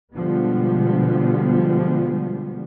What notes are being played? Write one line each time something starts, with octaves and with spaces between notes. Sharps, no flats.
B2 D3 F3 G3 G#3 B3